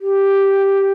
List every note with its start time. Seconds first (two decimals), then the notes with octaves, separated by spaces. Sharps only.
0.01 G4